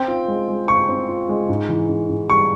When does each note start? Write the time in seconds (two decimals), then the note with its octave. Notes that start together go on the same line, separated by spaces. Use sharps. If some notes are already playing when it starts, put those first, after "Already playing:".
Already playing: C4 G5
0.08 F4
0.28 G#3
0.48 G#3
0.68 F4 C#6
0.89 C4
1.09 F4
1.29 G#3
1.49 G#2
1.69 E3
1.89 G#2
2.09 G#2
2.29 G3 C#6